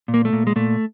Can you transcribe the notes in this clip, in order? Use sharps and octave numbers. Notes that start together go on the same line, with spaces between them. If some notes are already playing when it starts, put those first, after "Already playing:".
A#2
A#3
A3
A#2
G#3
A#2 A3